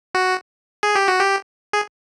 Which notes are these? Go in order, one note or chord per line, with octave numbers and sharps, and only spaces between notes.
F#4
G#4
G4
F#4
G4
G#4